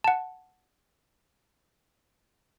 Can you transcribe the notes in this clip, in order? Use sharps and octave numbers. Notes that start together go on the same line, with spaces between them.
F#5 A5